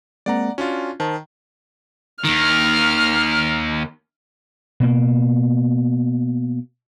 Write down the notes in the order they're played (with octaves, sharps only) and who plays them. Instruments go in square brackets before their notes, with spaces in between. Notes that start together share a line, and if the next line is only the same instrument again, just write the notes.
[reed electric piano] G#3 A#3 C4 [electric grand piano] D5 F#5 A#5
[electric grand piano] C#4 D4 F4 [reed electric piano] F#4
[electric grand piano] D#3 [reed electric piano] C5 A5
[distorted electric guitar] D#2 D#3 [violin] F6
[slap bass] B2 A#3